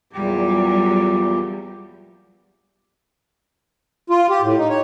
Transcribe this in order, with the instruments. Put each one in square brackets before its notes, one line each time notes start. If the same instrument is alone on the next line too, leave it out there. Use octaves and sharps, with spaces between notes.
[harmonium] E2 A#2 G4 [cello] F#3 G3
[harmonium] F4
G4
A2
D#4
C#5